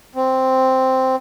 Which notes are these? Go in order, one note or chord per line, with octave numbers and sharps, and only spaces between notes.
C4